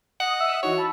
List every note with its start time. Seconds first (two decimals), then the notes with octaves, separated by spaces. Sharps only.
0.20 D#5 F#5
0.40 E5 D#6 E6
0.63 E3 D#4 F#4 C#5
0.78 A5 B5 E6